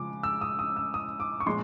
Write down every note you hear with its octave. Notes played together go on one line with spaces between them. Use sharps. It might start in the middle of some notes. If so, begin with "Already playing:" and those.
Already playing: C#3 F3 G#3 D6
E6
D#6
D#6
E6
D#6
D6
C#6
A#2 F3 G#3 C6